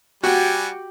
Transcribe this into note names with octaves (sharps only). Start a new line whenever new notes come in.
G3 F#4 G4 G5 G#5